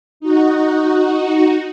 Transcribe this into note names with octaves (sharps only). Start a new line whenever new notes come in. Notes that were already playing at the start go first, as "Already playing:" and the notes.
D#4 F#4